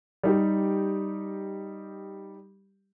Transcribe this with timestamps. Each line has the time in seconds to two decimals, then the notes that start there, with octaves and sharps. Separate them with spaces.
0.23 G3 D#4 G4